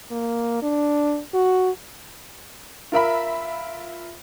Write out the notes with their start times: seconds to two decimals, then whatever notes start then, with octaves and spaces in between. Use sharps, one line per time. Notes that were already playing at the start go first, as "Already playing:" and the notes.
0.11 A#3
0.62 D4
1.34 F#4
2.92 F4 A#4 E5 B5